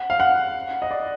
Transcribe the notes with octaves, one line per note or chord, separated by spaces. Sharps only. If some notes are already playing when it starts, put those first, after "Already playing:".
Already playing: F#5
F5
F#5
D#5
D5